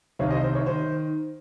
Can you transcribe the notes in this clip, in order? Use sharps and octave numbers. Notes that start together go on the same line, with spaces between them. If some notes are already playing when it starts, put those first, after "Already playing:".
C2 C3 D#3 C#5 F5
C5 D#5
C5
C#5
D#3 C5